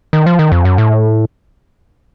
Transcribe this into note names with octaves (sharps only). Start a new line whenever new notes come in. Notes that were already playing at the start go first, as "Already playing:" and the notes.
D#3
F3
D#3
F2
F#2
A2